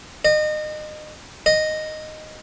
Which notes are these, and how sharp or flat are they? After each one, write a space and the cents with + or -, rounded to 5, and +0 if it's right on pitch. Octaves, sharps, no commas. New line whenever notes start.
D#5 -30
D#5 -5